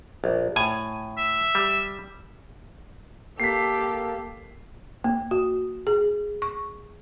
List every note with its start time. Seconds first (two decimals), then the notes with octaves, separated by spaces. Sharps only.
0.24 A#1
0.56 A2 G#5
1.18 E5
1.55 G3
3.40 A#3 G4 A4 B6 C7
5.04 A#3
5.31 F#4
5.87 G#4
6.42 C#6